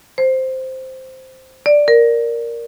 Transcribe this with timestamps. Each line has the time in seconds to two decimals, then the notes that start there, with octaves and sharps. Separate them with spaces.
0.18 C5
1.66 D5
1.88 A#4